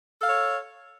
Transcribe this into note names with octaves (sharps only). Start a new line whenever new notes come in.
A4 C#5 F5